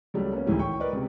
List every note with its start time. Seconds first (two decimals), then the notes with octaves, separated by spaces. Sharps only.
0.14 C#2 F#3 G3 A3
0.33 A#3 B3 C#4
0.47 A1 D2 G#2 E3 G3
0.59 G5 C#6
0.80 A#4 B4 D5 D#5
0.93 C#2 C3